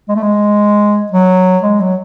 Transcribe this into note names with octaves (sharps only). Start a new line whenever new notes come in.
G#3
A3
G#3
F#3
G#3
F#3